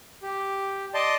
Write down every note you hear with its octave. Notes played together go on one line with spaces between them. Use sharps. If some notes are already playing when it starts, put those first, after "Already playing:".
G4
D5 D#5 A5 C6